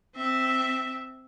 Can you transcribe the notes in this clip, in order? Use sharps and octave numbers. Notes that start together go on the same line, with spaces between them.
C4 E5